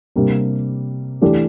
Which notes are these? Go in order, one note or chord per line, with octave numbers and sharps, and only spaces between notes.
C3 G3 A#3 D4
E3 A3 D4 G4 D5